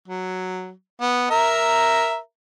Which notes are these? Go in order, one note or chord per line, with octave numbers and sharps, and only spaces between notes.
F#3
B3
A#4 E5 A#5